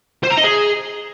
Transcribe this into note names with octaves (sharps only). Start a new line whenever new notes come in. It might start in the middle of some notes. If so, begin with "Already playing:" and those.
C5
A#5
D#5
G#4